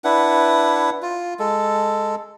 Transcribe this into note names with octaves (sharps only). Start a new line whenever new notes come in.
D4 E4 B4 F#5
F4
G#3 A4